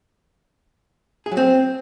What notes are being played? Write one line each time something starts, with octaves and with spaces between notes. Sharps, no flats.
G#4
F#3
C4